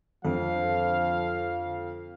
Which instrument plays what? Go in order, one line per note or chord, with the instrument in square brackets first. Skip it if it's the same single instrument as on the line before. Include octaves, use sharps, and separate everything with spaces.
[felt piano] F2 [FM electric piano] D3 A4 [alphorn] F3 [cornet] F5